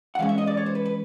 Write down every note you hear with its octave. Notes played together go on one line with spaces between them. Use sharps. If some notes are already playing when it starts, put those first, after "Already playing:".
F#5
E3 G#3 C#4 F5
E5
D#5
D5
C#5
C5
B4
B4